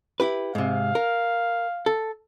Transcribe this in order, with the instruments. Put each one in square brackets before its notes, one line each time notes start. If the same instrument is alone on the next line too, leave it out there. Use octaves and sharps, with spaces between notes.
[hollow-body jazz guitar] E4 G4 B4
[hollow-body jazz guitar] G#2 C3 [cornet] F5
[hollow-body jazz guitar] A#4
A4